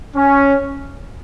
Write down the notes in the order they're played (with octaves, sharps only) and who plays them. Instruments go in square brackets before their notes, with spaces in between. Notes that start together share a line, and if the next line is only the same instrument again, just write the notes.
[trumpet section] C#4